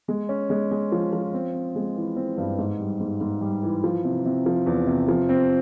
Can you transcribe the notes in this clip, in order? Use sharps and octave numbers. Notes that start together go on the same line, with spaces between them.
G#3
C#4
G#3
G#3
F3
F3
C4
C4
G#3
E3
C4
G2
G#2
G3
G#2
G#2
G3
E3
F3
C3
C3
F3
E2
C3
F3
C4